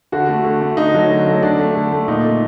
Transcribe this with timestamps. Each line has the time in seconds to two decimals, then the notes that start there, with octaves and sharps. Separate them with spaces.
0.12 D3 F#4
0.29 A3
0.44 D3
0.61 A3
0.77 D3 D#4
0.94 F#3 A3
1.11 D3
1.26 F#3 A3
1.42 D3 D4
1.59 A3
1.75 D3
1.92 A3
2.08 A#2 D#4
2.24 A3